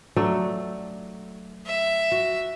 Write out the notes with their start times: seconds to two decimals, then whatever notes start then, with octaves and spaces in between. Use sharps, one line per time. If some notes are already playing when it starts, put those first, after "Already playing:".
0.16 F#3 A3 D4
1.66 E5
2.12 F#4